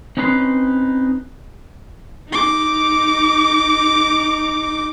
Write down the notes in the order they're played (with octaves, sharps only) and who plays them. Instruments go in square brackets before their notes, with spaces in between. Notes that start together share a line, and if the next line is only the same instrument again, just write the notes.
[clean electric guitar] C4 C#4 D#4 B4 A#5 C6
[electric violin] D#4 D6